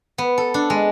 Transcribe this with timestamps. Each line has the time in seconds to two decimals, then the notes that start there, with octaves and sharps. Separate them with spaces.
0.18 B3
0.38 A4
0.54 D4
0.70 G#3